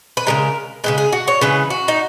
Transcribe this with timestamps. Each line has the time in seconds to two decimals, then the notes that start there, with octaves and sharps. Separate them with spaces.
0.17 B4
0.27 C#3 E3 G#3 A#4
0.84 C#3 E3 G#3 B4
0.98 G#4
1.13 F#4
1.28 C#5
1.41 C#3 E3 G#3 B4
1.70 F#4
1.88 D#4